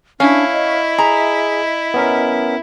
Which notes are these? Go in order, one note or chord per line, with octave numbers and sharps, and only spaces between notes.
C#4 D4 E4 F5
D#5
G#4 A#5
B3 C#4 A#4